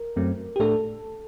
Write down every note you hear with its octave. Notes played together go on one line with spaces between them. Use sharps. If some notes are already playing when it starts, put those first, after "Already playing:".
Already playing: A#4
F#2 F#3 A3 C4
G4
A2 A3 D4 A4